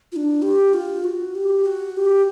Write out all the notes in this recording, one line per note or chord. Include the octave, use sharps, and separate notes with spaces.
F4
D4
G4
F4
F#4
G4
F#4
G4